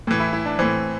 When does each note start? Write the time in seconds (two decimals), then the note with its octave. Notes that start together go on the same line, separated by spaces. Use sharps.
0.07 A2 E3
0.20 E4
0.33 E4
0.46 D4
0.59 A2 E3 C4